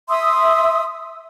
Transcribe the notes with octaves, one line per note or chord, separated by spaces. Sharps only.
E5 C6 D#6 E6